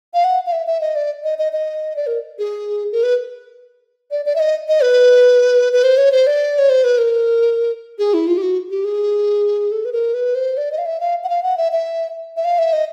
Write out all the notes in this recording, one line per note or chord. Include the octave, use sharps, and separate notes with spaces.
F5
F#5
F5
E5
E5
D#5
D5
D#5
D#5
D#5
D5
A#4
G#4
A#4
B4
D5
D5
E5
D#5
D#5
B4
B4
C5
C#5
C5
D5
C#5
C5
B4
A#4
G#4
E4
F4
G4
F#4
G4
G#4
A4
B4
A#4
B4
C5
D5
D#5
F5
E5
F5
F#5
F5
F#5
E5
E5
E5
F5
E5
D#5